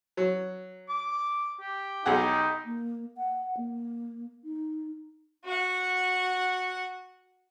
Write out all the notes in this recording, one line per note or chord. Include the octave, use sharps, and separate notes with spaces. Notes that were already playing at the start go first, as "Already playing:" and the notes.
F#3
D6
G4
B1 D#4 G#4 F#5
A#3
F#5
A#3
D#4
F#4 F#5